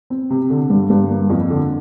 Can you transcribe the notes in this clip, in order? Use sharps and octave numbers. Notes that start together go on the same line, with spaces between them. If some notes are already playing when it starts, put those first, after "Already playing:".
C4
C3
D3
G2
G2
A#3
F2
D3